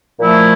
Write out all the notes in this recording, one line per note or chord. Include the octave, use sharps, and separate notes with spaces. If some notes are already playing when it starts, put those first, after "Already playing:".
A#2 F3 A3 E4